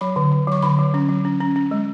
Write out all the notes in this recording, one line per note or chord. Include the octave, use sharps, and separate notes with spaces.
F#3 B5
D3
D3
F#3 C#6
D3 B5
F#3
C#4
F#3
C#4
C#4
C#4
G#3